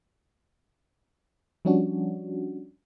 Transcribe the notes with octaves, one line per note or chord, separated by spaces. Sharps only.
F3 G3 C#4 D4 F#4